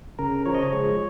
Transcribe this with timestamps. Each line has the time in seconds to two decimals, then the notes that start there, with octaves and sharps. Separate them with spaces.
0.19 C#3 A#4
0.45 F3 C#5
0.55 D#5
0.62 C#5
0.73 G#3